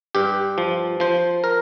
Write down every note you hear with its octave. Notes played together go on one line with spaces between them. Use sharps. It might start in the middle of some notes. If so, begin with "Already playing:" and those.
G2 G4
F3
F3 C5
A#4